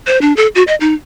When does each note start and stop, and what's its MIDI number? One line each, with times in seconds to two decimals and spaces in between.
0.07 0.19 72
0.21 0.35 62
0.36 0.48 69
0.55 0.63 66
0.67 0.75 75
0.80 0.94 63